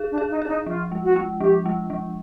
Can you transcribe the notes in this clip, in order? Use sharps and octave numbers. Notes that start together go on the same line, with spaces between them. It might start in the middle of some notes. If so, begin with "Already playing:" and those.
Already playing: D#4 G#4
D4
G#4
D#4
D4 G#4
D#4
F3 F4
G#3
F#4
G#3
F3 G4
G#3
F3